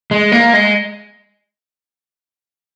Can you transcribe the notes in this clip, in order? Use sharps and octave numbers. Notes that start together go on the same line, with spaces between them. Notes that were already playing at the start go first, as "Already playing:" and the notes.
G#3
A#3
G#3